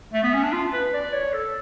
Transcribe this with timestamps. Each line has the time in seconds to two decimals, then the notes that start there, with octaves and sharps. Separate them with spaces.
0.13 A3
0.23 B3
0.34 C#4
0.43 D4
0.53 F4
0.73 B4
0.94 D5
1.13 C#5
1.33 A4